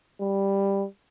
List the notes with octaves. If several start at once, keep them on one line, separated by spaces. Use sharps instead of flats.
G3